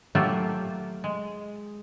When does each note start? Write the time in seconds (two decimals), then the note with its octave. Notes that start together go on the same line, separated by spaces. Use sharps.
0.15 F#3 A3 A#3 F4 G4
1.04 G#3